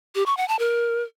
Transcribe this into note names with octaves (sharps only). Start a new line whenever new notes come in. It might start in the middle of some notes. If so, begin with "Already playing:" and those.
G4
C#6
F#5
A5
A#4